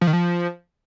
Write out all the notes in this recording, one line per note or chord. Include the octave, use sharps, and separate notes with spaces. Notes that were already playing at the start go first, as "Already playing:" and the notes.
F3
D#3
F3